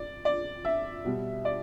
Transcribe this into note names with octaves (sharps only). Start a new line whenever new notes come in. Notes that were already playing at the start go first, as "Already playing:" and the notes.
Already playing: D5
D5
E5
B2 G3
D5